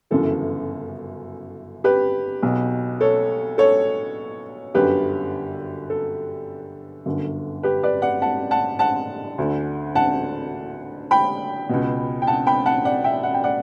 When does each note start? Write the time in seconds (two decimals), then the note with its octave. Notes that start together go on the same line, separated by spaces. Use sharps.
0.11 G1 F#2 C#3 E3 A4
1.84 G4 B4
2.43 B1 B2
3.01 A4 C#5
3.58 A4 C#5
4.74 G1 F#2 D3 G4 B4
5.90 A4
7.06 G1 F#2 D3
7.63 G4 B4
7.83 B4 D5
8.02 D5 F#5
8.22 F#5 A5
8.51 F#5 A5
8.79 F#5 A5
9.38 D2 D3
9.95 F#5 A5
11.11 G5 B5
11.69 C#2 B2
12.22 G5
12.27 F#5 A5
12.47 G5 B5
12.66 F#5 A5
12.85 D5 F#5
13.04 E5 G5
13.23 F#5
13.34 G5
13.44 D5 F#5